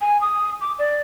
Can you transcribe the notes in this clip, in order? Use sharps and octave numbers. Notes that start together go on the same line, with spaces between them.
G#5
D#6
D6
D5